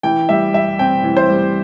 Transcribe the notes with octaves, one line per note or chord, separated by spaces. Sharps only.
E3 G5
G3 E5
G3 E5
C4 G5
E3
C5
G3